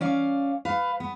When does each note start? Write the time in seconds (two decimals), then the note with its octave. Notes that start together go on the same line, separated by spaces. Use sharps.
0.01 C#4 D5 F5
0.65 B4 F5
1.00 B3